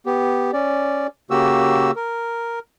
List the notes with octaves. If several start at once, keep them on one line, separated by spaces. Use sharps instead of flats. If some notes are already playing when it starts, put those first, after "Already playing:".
B3 G4
C#4 D5
C#3 A#3 F#4 G4 E6
A#4